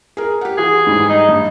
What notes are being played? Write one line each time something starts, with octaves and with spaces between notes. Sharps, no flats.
G#4 A#4
G4 F#5
E3 F#4 G#4
G#2 E3 G3
D#4
G2